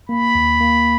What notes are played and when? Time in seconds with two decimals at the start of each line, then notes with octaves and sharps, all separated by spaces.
0.09 A#3 B5
0.35 D#2
0.61 A#3